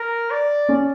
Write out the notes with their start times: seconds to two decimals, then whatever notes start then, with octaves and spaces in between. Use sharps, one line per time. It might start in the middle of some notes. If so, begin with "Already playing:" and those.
Already playing: A#4
0.30 D5
0.69 C#4